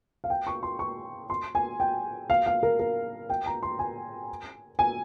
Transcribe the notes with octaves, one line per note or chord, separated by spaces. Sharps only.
F5
G5
C#6
C6
C#6
C6
G#5
G5
F5
F5
A#4
A#4
G5
A#5
C6
G#5
G#5